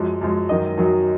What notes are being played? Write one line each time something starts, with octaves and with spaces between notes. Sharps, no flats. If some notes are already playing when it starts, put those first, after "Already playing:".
Already playing: F#2 F3 G#3
F#2 F3 G#3
F#2 D#3 F#3 D#5
F#2 D#3 F#3